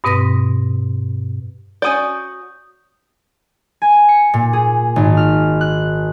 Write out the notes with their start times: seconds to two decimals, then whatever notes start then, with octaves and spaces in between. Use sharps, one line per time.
0.04 G2 B2 C4 B4 D#6 A#6
1.82 C#4 F#4 D5 D#6 G6
3.82 G#5
4.09 C#7
4.34 A#2
4.53 G#4
4.96 G#1
5.17 F6
5.61 F#6